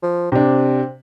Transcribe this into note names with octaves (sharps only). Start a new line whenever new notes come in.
F3
C3 C4 D4